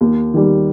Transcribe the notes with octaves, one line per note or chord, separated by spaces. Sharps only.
D#2
D#3 G3